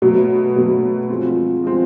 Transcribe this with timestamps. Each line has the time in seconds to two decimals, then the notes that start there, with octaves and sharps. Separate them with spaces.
0.02 B2 F#3 A3
0.56 B2 F#3 A3
1.09 F3 G#3 C4
1.64 F3 G#3 C4